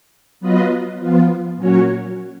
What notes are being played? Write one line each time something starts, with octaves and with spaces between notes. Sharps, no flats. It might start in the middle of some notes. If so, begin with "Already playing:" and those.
F#3 B3 F4 B4 D#5
F3 B3 F4
A#2 F#3 C#4 F#4 C#5